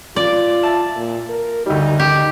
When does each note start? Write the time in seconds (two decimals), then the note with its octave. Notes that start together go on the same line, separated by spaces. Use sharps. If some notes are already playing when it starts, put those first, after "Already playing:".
0.16 F4 D5
0.63 E5 A5
0.96 A#2
1.29 A#4
1.66 D2 G3 D#4
2.00 G4